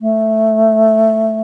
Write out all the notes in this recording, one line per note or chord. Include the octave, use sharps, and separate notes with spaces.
A3